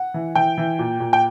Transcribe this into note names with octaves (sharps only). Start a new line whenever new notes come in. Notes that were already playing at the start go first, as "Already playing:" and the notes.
Already playing: F#5
E3
E3 G5
E3
A#2
A#2
G5